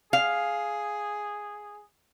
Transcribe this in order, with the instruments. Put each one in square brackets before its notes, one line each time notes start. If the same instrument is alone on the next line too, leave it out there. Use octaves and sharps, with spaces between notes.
[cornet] G#4 [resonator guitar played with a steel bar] F5